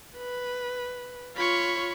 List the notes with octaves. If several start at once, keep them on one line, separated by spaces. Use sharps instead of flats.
B4
F4 C#5 B5 C#6